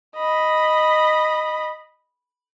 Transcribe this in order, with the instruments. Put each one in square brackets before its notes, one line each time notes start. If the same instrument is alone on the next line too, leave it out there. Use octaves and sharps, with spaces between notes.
[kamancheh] D#5 B5